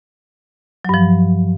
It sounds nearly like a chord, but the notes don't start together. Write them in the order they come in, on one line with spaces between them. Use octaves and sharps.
F#3 G2 F3